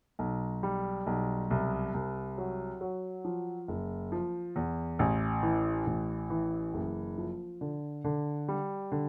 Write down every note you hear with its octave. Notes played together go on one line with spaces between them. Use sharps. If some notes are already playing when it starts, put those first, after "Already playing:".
B1
G3
B1
C2
C2
F#3
F#3
F3
F#1
F3
E2
A1
E3
A1
E3
F#1
F3
D3
D3
G3
D3